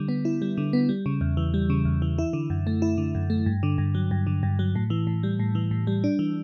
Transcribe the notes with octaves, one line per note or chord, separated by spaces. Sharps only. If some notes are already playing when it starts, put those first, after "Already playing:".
Already playing: D3 G3
B3
E4
G3
D3
B3
G3
C#3
E2
E3
G3
C#3
E2
E3
E4
D3
F#2
A3
E4
D3
F#2
A3
G2
D3
G2
F#3
G2
D3
G2
F#3
A2
E3
A2
G3
A2
E3
A2
G3
D4
E3